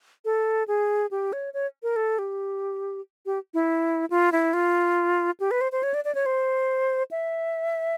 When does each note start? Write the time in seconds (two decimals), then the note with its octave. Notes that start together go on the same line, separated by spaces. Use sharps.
0.25 A4
0.68 G#4
1.11 G4
1.33 C#5
1.54 C#5
1.83 A#4
1.96 A4
2.19 G4
3.26 G4
3.54 E4
4.10 F4
4.32 E4
4.54 F4
5.40 G4
5.51 B4
5.61 C5
5.72 C5
5.83 C#5
5.94 D5
6.05 D5
6.15 C#5
6.26 C5
7.11 E5